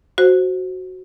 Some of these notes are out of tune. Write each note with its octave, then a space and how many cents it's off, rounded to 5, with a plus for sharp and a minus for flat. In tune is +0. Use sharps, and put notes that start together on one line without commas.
F#4 +0 C5 +0